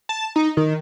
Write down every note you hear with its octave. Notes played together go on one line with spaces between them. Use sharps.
A5
D#4
D#3